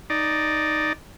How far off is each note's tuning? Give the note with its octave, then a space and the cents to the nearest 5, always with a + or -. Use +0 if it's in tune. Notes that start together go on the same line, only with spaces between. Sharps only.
D#4 -5 D5 +0